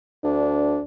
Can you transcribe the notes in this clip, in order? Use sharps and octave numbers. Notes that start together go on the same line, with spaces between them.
D2 D4